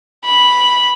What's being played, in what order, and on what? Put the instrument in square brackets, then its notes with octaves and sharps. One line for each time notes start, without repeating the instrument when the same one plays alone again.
[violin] B5